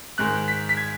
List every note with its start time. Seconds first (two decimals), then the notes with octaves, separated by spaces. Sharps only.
0.18 G#2 D#3 G#3 F#6
0.48 B6
0.69 B6
0.77 G#6